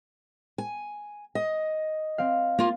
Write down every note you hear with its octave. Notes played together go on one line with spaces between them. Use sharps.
G#5
D#5
C4 F5
A#3 F4